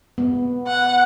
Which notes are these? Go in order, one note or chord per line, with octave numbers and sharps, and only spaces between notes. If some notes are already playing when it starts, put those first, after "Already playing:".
B3
F#5